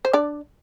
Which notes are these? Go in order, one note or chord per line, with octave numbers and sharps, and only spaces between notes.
C5
D4 D5